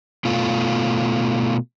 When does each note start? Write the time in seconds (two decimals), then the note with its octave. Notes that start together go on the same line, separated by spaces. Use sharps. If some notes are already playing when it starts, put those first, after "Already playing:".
0.25 B2 A3 F4